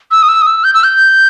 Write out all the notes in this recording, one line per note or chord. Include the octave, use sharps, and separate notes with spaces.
E6
D#6
E6
D#6
E6
G6
E6
G6